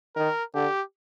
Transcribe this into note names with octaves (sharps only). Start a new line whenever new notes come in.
D#3 A#4
D3 G4